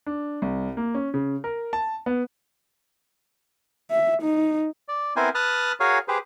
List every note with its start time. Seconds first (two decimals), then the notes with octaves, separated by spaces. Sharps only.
0.06 D4
0.42 C2
0.77 A#3
0.95 C#4
1.14 C#3
1.44 A#4
1.73 A5
2.06 B3
3.91 E5
4.22 D#4
4.88 D5
5.16 B3 C4 E4 A#4 C5 G#5
5.35 B4 A5 D#6 F6 F#6
5.80 F#4 G#4 A#4 C#5 F5 G#5
6.08 G4 G#4 B4 C5